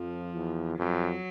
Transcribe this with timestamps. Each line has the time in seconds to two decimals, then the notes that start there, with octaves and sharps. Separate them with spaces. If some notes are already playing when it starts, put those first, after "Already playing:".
Already playing: F2 F3
0.35 E2
0.78 F2 F#3